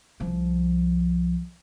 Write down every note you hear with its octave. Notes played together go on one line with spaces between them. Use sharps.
C2 F3